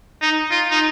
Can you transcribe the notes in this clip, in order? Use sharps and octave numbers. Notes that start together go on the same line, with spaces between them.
D#4
F4
D#4